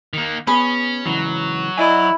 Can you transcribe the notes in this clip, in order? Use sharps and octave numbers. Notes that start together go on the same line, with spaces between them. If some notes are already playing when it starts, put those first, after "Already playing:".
D#3 A#3
B3 C#4 G#4 B5
G#2 C#3 E3 F#3
E4 D5 D#5 G#5